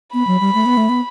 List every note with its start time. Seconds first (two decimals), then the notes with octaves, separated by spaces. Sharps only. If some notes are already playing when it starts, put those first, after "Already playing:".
0.14 B3 B5
0.27 F#3
0.41 G3
0.55 A3
0.66 B3
0.77 A3
0.89 B3